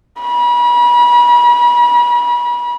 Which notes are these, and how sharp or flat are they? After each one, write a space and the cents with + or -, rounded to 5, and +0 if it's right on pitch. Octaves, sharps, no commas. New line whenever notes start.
B5 -40